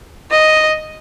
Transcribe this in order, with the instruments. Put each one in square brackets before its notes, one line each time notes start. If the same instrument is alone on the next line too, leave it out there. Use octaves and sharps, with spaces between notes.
[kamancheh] D#5